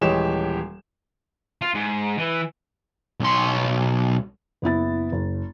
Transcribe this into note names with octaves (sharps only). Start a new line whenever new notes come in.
D#1 E3 G#3 G4 C#5 E7
F4
G#2
E3
B1 C6
F#1 B3 E4 A6
F#1